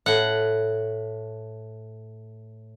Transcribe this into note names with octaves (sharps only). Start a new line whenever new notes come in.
A2 F#5